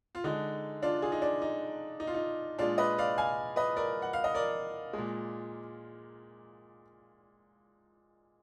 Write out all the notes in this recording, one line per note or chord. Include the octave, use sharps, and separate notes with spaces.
F4
D3 G#3 D#4
D4 F4
F4 G#4
D#4
D4
D#4
D#4
F4
D#4
A#2 G#3 D4 F4
B4 D#5
D5 F5
F5 G#5
B4 D#5
A#4 D5
F#5
F5
D#5
A#4 D5
G#3
A#2